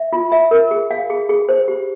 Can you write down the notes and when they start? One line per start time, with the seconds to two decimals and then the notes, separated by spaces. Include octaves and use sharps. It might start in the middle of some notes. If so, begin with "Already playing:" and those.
Already playing: E5
0.13 F4
0.32 E5
0.51 A#4
0.71 G#4
0.91 F5
1.10 G#4
1.29 G#4
1.49 C5
1.68 G4